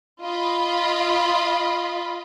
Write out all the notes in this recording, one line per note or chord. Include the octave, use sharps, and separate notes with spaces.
F4 D#5 B5